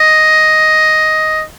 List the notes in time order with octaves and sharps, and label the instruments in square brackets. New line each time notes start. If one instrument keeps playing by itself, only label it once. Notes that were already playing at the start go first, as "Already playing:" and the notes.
Already playing: [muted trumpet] D#5